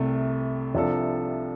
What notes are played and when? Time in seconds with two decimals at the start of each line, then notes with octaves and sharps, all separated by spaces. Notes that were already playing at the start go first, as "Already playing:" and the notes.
Already playing: C2 C3 A3
0.75 C2 C3 F3 D4 A4